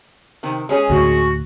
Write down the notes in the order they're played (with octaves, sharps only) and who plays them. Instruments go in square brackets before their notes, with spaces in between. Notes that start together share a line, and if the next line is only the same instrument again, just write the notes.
[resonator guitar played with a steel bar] C3 D#3
G#3 C#4 G#4
[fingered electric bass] D2 A2 [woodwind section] F#4